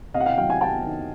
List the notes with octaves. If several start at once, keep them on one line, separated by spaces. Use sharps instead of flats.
C3 D#5 F5
F#5
F5 G5
F#3 F5 G5
F#5 G#5
C3 G5 A5
D#3